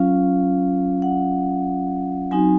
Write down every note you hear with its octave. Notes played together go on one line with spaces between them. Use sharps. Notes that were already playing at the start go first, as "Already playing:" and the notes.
Already playing: F#3 C#4 F4 F5
F#5
F#3 C4 D#4 F#4 G#5